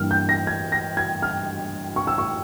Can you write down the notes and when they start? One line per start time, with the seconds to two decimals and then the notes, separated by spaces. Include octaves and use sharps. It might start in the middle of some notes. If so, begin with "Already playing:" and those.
Already playing: G2 E3 G3 A#3 F6
0.11 G6
0.29 A#6
0.47 G#6
0.72 A#6
0.97 G#6
1.22 F6
1.96 C#6
2.07 E6
2.18 C#6